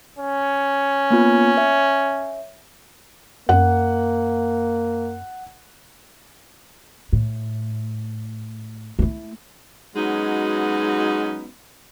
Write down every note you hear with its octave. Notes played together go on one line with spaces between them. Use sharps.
C#4
A#3 B3 F4
C#5 E5
F#2 A#3 F#5
A2
A3 E4
F#3 G#3 B3 C#4 D#4 F#4